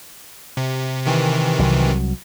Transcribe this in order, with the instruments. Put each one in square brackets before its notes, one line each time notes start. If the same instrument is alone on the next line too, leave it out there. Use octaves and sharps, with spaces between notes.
[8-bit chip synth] C3
C3 D#3 E3
[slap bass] C2 F#3